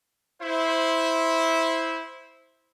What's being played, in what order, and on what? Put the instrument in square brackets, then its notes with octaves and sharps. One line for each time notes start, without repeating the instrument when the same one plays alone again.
[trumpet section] E4 C5